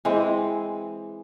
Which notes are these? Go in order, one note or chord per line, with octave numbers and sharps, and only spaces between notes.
E3 G#3 C4